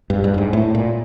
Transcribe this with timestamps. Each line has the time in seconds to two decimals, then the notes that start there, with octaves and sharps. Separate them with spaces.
0.10 G2
0.24 G2
0.34 A2
0.38 G#2
0.53 A2
0.75 A#2